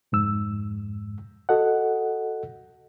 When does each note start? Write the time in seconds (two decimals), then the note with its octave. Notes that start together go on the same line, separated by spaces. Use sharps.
0.12 F2 G#2 E6
1.49 F#4 A4 D#5 F#5